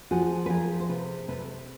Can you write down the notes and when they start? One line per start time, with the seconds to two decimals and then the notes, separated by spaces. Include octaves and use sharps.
0.11 F3 F#4 G#4
0.46 B4
0.50 F3 G#4 A#4
0.80 C5
0.89 C3 A4 B4
1.28 C3 A4 B4